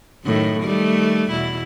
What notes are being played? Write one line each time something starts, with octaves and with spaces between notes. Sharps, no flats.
F#2 A2 D#3
D#3 G3 A3
E2 B2 E4